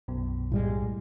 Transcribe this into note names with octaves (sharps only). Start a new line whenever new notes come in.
B1 F#2 B2
A2 G3 G#3